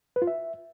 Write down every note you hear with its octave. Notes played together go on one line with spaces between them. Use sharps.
B4
F4
E5